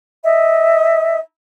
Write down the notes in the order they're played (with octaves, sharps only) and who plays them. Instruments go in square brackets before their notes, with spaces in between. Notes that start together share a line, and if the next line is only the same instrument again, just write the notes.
[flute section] D#5 E5